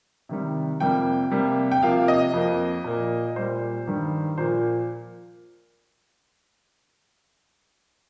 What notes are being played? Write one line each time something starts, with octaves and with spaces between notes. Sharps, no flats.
C3 D#3 G3
F2 C3 G3 A#3 G5
C3 G3 A#3
G5
C3 F3 A#3 F5
D#5
F2 F3 A#3
A#2 A#3
A#2 G3 A#3 C5
G2 D#3 G3
A#2 F3 A#3 C5